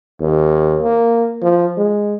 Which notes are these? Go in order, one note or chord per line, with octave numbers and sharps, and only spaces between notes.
D#2
A#3
F3
G#3